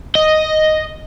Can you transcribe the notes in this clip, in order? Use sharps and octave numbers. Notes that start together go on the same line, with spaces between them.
D#5